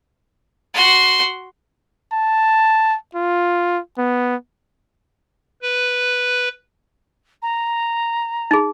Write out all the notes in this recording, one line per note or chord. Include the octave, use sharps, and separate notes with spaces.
F#4 C6
A5
F4
B3
B4
A#5
D#4 G#4